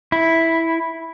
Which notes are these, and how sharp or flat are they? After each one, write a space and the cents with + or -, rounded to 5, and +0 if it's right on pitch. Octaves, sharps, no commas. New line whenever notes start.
E4 -5